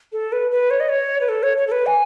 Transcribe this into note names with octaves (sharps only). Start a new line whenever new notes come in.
A4
B4
B4
C#5
D#5
C#5
B4
A4
C#5
C#5
A4
B4
G#5